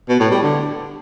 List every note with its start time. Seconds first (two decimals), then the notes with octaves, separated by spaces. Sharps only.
0.09 B2
0.20 A2
0.31 G3
0.42 D3